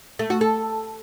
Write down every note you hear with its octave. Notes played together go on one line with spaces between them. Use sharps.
A3
F#4
A4